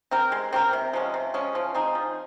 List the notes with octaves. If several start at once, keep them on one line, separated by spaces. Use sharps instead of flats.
C4 G4 A#4
G#3
C4 G4 A#4
C3
F3 G#3 C#4
C3
F3 G#3 C#4
F3
C4 D#4 G#4
F3